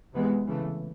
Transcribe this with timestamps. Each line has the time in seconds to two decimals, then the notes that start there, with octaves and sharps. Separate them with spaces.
0.15 C3 E3 G#3 B3
0.47 C#3 E3 A3